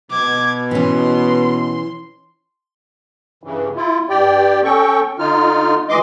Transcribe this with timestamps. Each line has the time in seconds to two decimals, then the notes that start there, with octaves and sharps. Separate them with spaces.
0.11 B2 D6 G#6
0.71 E3 C#4 C6
3.43 G2 C#3 E3
3.76 E4 F4
4.09 G2 G4 D5 G5
4.64 C#4 A4 G5 C#6
5.19 D3 D#4 F4 F6
5.89 D2 E3 G#3 D#5 C6 D6